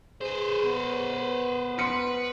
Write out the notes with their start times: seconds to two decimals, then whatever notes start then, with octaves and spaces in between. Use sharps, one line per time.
0.21 G#4 B4 C5
0.63 B3
1.79 B4 C6 C#7